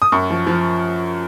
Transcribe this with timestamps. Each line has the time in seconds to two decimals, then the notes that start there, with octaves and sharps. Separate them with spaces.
0.02 D#6
0.12 F#2 C#6
0.30 F3
0.47 F3